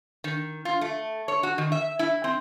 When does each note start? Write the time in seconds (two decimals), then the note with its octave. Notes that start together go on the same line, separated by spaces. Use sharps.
0.24 D#3
0.65 F4
0.81 A3
1.28 C#5
1.43 F#4
1.58 D#3
1.72 E5
1.99 E4
2.24 C4